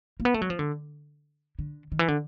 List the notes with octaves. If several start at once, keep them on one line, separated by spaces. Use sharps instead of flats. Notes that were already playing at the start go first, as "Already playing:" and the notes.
A#3
B3
A3
F#3
F3
D3
D3
D#3
E3
D3